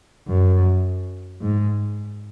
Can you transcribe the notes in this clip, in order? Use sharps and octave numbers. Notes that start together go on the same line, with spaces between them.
F#2
G#2